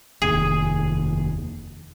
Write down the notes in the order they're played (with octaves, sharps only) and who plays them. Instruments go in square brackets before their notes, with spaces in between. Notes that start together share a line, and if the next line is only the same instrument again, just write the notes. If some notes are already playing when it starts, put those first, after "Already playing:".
[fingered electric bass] F1 D#2 [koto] G#4